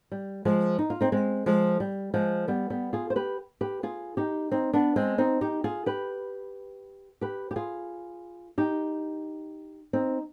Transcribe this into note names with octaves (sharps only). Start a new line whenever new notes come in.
G3
F3 G#3
D#4
F4
C4 D#4
G#3 C4
F3 G#3
G3
F3 G#3
G3 B3
G3 B3
F4 G#4
C5
G4 B4
G4 B4
F4 G#4
D#4 G4
C4 D#4
B3 D4
G#3 C4
C4 D#4
D#4 G4
F4 G#4
G4 B4
G4 B4
G4
F4 G#4
D#4 G4
C4 D#4